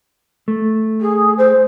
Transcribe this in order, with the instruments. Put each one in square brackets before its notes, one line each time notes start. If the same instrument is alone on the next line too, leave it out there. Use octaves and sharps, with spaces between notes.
[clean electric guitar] A3
[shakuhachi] G#4
C5